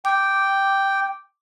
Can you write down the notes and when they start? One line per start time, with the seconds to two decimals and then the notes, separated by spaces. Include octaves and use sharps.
0.05 G5 D6